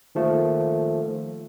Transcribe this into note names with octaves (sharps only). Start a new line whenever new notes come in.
D#3 F3 A3 A#3